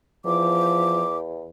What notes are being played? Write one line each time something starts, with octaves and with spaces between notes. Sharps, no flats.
E2 F3 D6